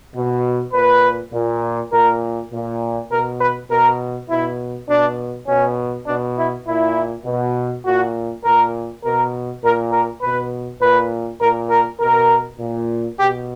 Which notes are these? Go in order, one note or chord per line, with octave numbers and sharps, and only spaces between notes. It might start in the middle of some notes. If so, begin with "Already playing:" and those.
B2
A#2 B4
A#2
A#2 A#4
A#2
B2 A#4
B4
B2 A#4
B2 E4
B2 D4
B2 C#4
B2 D4
E4
A#2 E4
B2
A#2 F#4
A#2 A#4
B2 A#4
A#2 A#4
A#4
B2 B4
A#2 B4
A#2 A#4
A#4
B2 A#4
A#2
B2 G4